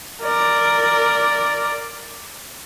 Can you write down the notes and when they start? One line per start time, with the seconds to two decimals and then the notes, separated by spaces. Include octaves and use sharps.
0.22 A#4 D5